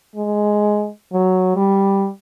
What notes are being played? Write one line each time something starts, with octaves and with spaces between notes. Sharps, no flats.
G#3
F#3
G3